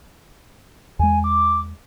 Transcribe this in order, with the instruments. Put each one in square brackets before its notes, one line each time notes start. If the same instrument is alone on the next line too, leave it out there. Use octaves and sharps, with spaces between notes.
[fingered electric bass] E2 G#3 [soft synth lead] G#5
[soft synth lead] D6